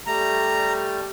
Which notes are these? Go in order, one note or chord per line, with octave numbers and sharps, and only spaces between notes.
G3 A3 A#5